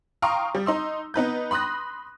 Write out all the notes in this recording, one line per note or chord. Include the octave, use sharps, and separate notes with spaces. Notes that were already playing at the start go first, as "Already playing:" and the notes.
F5 G5 A#5 C6 C#6 D#6
G3
D#4 C6 E6
B3 D#4 B4 G6
B5 C6 D#6 F#6 A#6